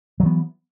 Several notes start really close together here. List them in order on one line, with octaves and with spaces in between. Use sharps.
F#3 E3 B3